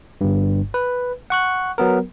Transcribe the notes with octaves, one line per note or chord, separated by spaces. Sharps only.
G1 G2
B4
F#5 C#6 F#6
F#3 B3 A#4